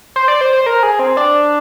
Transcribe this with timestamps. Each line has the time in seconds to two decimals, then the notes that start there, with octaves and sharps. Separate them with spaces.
0.16 C5
0.28 D5
0.41 C5
0.53 C5
0.66 A#4
0.83 G#4
0.99 C4
1.17 D4